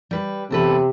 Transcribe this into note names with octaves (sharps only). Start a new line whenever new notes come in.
G3 B4
E2 C3 A4 B4